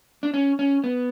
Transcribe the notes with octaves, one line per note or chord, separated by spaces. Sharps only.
D4
C#4
C#4
B3